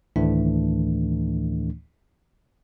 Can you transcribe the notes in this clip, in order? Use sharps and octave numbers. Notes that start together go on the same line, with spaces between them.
D2 A2 D#3 E3 A3 D4